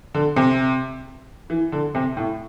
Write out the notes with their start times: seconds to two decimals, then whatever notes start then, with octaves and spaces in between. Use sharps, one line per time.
0.14 D3
0.36 C3
1.50 E3
1.72 D3
1.95 C3
2.17 A2